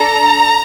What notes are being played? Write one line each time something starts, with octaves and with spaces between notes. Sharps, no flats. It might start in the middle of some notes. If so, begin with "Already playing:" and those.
Already playing: D4 A4 A#5